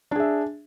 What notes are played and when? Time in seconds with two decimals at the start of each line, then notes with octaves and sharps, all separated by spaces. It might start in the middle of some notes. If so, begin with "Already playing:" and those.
0.11 D4
0.16 G#4
0.20 E5